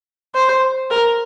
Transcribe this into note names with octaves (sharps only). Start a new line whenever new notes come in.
C5
A#4